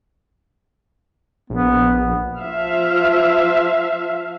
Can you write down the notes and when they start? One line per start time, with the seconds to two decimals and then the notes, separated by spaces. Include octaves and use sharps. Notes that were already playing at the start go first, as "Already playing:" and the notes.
1.50 A#1 B3
2.38 F3 E5 F5